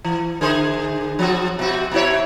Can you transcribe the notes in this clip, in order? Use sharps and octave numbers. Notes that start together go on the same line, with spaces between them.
E3
D3 G#4 C5
F3 C4 F#4
B2 C4 F#4
B2 E4 C#5